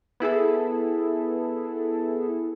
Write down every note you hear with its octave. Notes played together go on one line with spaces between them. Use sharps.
B3 E4 G#4 A4